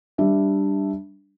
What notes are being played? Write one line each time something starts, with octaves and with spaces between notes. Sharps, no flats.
G3 D4 E5